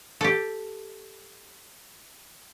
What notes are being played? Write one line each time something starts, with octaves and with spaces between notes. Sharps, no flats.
G4 A4